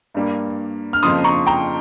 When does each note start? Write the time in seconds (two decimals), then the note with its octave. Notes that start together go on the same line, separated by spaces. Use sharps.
0.14 G2 G3 A#3
0.93 F6
1.03 F2 C#3 F3 A#3 C6 D#6
1.24 A#5 C#6
1.47 G5 A#5